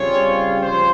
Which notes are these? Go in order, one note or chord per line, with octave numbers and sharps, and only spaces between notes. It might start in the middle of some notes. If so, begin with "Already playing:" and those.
Already playing: C#3 G3 C4 F4 C#5
C#3 F3 C5